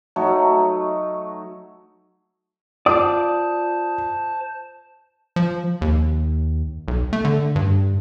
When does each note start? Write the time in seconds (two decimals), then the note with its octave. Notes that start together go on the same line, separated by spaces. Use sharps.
0.16 F#3 A3 D#4
2.86 F4 C5 D5 A5 D#6
5.36 F3
5.81 D#2
6.88 B1
7.13 A3
7.25 D3
7.56 G2